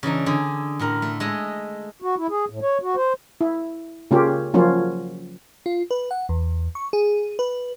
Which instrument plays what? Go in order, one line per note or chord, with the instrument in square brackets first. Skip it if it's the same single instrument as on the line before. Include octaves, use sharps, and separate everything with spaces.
[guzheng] C#3 E3 D4 D#4
D3 G#4
A2 D3 A#4
A3
G#3 A3 A4 D#5
[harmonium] F#4
E4
G#4
A2
C#5
F#4
C5
[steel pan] E4
C#3 A#3 C#4 F4 G4
F3 F#3 A#3 C#4 F4
[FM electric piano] F4
B4
F#5
E2
C#6
G#4
B4